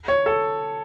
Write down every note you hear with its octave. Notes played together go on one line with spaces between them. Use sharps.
C#5
A4